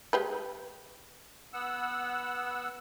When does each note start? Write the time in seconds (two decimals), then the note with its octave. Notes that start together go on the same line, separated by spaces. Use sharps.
0.13 G#3 G4 B4
1.53 B3 F#5 E6